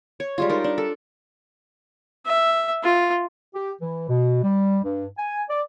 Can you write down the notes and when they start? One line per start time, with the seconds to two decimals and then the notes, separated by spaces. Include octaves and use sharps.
0.20 C#5
0.38 G3 G#3 F4
0.50 D#4 A#4
0.64 D4
0.78 A4
2.26 E5
2.83 F4
3.55 G4
3.81 E3
4.09 B2
4.44 G3
4.83 G2
5.18 G#5
5.50 D5